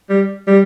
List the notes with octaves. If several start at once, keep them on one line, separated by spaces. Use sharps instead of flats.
G3
G3